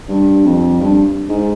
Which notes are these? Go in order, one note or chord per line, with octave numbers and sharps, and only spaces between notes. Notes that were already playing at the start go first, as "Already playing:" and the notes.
G2
F2
G2
G#2